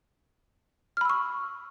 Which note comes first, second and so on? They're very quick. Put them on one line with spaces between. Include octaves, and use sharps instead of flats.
F6 B5 E6 C#6